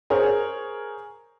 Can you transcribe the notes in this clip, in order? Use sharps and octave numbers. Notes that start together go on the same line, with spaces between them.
G#4 A#4 C5 C#5